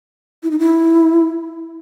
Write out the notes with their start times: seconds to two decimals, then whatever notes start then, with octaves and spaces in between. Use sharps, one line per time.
0.43 E4
0.51 D#4
0.59 E4